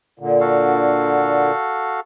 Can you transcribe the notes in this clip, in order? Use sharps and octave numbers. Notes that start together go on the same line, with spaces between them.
A#2 D3
F#4 A4 F5